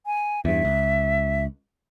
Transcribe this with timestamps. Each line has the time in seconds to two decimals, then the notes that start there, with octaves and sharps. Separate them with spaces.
0.06 G#5
0.45 E2 G2 E5
0.65 C#2